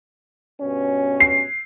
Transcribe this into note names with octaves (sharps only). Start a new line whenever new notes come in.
G2 B2 C#4
C7